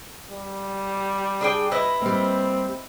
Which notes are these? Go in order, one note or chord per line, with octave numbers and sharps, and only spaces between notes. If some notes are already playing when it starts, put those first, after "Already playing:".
G3
D4 G#4 G5
E4 B4 D#5
G3 A#3 C4